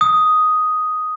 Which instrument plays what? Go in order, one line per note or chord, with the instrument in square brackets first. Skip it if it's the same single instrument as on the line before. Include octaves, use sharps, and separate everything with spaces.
[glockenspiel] D#6